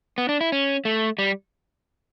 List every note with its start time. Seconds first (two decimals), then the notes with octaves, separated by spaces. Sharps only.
0.18 B3
0.29 D4
0.41 E4
0.52 C#4
0.85 A3
1.18 G3